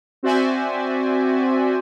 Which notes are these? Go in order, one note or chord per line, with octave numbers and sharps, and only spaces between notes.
C4 F#4 C5 D5 E5 G#5